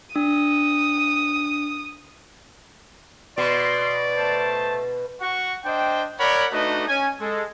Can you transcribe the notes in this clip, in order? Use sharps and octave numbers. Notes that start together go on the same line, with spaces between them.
D4 D#6
B2 D5 C6
A3 C5 A5
F#4 F#5 C#6
D4 C5 D#5 G5
A#4 C#5 D5 F#5 B5
A3 D4 D#4 F#4 B4 D#5
C#4 G#5
G#3 A4